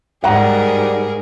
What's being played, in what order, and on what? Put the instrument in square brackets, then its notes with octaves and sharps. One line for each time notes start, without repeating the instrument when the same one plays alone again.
[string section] G#2 [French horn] G3 [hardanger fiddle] G#4 A#4 [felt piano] F#5 A#5